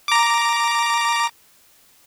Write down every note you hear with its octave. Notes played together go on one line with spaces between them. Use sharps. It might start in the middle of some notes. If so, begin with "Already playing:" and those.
A#5 D6